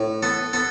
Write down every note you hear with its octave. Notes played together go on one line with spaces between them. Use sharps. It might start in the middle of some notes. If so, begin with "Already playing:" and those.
Already playing: A2
B3 A4
B3 A4